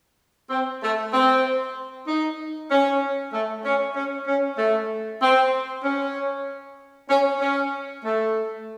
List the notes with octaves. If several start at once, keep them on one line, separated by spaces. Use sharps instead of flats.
C4
A3
C4
D#4
C#4
A3
C#4
C#4
C#4
A3
C4
C#4
C#4
C#4
A3